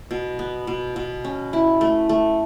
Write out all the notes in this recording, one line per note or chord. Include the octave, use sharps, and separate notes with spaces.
B2
B3
B2
B2
C#4
E4
A3
A3